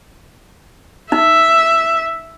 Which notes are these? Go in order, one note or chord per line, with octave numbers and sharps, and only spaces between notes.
D#4 E5